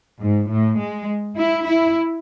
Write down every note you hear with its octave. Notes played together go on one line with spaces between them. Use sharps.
G#2
A2
G#3
E4
E4